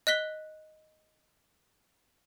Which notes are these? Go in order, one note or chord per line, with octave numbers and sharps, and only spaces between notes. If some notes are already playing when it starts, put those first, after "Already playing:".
D#5 F#6 B6 G7